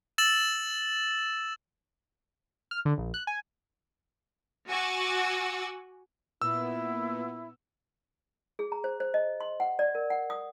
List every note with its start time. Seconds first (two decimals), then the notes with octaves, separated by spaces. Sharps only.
0.18 E6 A6 E7 F#7
2.71 F6
2.85 D3
2.98 A#1
3.14 F#6
3.27 G#5
4.69 F#4 F#5 G#5 C#6 D6 E6
6.42 A#2 B3 E4 E6
8.59 G#4
8.72 A#5
8.84 C5
9.00 C5
9.14 D#5
9.41 C6
9.60 F#5
9.79 D5
9.95 A#4
10.10 F#5
10.30 D#6